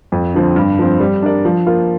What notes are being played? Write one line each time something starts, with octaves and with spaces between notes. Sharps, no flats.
F2
D3 F3 C4
G2
F3 C4
G3
D4 A#4 D5
F3
A#3 F4